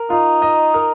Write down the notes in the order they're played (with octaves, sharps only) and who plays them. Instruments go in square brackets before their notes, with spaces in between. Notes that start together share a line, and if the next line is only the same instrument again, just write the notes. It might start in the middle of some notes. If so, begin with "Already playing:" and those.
Already playing: [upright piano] A#4
[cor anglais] D#4 [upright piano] F4
[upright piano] D#5
A#4